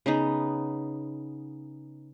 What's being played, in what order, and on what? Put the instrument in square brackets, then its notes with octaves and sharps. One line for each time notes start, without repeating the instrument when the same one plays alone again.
[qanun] C#3 B3 D#4